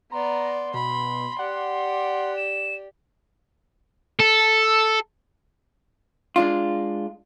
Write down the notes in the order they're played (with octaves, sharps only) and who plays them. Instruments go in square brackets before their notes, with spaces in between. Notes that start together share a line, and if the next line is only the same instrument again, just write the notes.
[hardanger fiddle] B3 D5 [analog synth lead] A#5 [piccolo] C6
[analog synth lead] B2 [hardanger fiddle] B5
[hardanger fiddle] G4 D5 [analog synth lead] F#5
[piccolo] E7
[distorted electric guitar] A4
[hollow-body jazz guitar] G#3 D4 F4